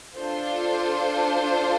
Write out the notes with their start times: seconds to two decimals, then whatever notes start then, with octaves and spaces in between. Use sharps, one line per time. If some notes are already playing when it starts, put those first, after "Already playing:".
0.15 D4 F4 A4 C5